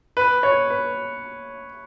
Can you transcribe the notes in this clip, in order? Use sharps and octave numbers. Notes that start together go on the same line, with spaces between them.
B4
C#5
B4